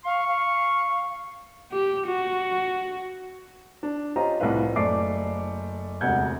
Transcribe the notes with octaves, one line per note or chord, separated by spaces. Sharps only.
F5 C#6
F5
G4
F#4
D4
C#4 F4 G4 C5 D#5 A#5
C2 A2 F3 B4 F5
F#1 A3 C5 D5 D6 C7
E1 D2 C3 F#5 G6 G#6